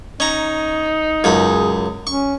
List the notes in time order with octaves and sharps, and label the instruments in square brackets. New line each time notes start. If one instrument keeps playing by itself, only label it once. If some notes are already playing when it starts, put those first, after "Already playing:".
[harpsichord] C#4 A#5 [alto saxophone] D#4
[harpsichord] C#2 F#2 B5 [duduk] G#4
[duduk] C#4 [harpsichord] C#6